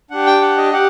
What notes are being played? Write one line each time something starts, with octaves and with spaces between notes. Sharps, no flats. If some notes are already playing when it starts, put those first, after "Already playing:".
D4 G4 F#5
G5
F#5
D#5
G4 F#5